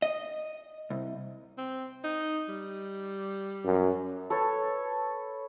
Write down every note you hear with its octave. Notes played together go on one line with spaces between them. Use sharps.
D#5
C2
C4
D#4
G3
F#2
A4 B4 C#5 A5